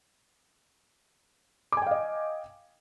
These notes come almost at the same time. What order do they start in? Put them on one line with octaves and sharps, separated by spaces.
D6 G#5 G5 F5 D#5